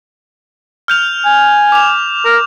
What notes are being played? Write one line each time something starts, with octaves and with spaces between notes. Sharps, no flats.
F6 G6 F7
G#5
D6 F7
A#4